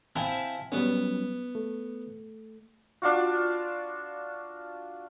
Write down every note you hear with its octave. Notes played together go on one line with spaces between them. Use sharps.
C4 E4 E5 F5 G#5 A5
F#3 G3 B3 C#4
A3
D4 F4 F#4